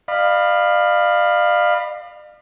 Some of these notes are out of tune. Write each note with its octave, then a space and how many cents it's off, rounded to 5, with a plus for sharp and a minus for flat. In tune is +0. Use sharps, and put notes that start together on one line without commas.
D5 +45 F5 +0 B5 +0